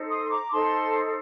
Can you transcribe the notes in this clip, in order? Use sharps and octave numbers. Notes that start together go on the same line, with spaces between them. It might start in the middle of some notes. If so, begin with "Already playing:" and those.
Already playing: D#4 A4 C5
C6 D#6
C6
A#5 D6
D#4 A4 C5 A5 C6